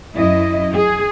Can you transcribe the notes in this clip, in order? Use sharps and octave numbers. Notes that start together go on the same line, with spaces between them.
F#2 E4 D#5
G#4